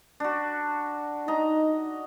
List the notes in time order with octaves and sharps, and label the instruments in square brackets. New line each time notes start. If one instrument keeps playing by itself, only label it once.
[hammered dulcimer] D4 F#4
[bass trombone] D#4 [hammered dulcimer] D#5 A#5